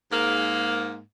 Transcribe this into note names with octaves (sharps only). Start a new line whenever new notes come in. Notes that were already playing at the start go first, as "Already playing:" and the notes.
G#2 A#3